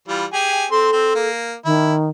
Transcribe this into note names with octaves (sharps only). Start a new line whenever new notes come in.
E3 G3 F4
G4 G#4 G#5
C4 A4 C6
C4
A#3
D#3 E4